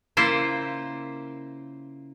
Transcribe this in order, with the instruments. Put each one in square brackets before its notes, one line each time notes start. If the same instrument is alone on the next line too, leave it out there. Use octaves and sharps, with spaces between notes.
[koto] C#3 A#3 E4 F4 C5